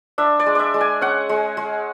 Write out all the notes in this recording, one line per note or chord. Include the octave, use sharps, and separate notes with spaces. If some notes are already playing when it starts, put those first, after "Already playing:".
D4 E5
D5
G#3
D5 E5
G#3
G#5
C#4 F#5
G#3
G#3